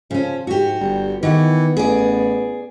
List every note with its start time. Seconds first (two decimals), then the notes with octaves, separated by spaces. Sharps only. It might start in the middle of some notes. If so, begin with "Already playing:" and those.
0.11 C#3 F3 C#4
0.47 G#2 F#4 G4
0.80 G1 G3
1.23 D#3 E3 B3 F#5
1.77 A1 G#4 D5